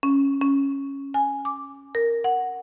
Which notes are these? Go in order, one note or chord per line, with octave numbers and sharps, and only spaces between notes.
C#4
C#4
G#5
D6
A#4
F#5